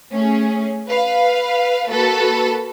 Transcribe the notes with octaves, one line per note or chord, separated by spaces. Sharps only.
A3 C#4 G#4
B4 F5
A#3 F#4 A4 B4